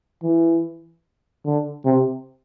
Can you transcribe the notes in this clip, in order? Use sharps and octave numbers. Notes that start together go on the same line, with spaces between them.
E3
D3
C3